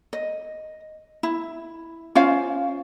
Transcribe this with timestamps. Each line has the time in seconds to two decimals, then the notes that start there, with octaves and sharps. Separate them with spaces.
0.13 D#5
1.23 E4
2.15 C#4 F4 C5 F5